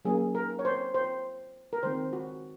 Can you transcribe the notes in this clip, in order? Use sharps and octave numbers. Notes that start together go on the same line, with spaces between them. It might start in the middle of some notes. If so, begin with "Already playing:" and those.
F#3 A#3 C#4 G#4
A#4
C#5
C5
C5
A#4
D#3 G#3 C4 C5
F#4